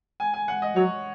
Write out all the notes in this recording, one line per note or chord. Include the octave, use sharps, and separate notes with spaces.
G#5
G#5
F#5
D#5
F#3 C#5